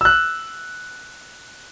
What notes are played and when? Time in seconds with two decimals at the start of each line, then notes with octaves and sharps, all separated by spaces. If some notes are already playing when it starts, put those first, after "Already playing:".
0.01 E6 F#6